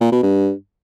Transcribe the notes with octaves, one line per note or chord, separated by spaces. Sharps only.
A#2
B2
G2